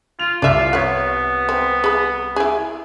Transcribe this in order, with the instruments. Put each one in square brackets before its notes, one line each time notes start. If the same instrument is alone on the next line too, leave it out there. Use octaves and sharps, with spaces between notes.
[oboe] F4 [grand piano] F7
[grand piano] C2 [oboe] F4 [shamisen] D5 E5
[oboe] B3 [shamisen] C#5 F#5
[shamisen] C4
G#4 B5
E4 G#4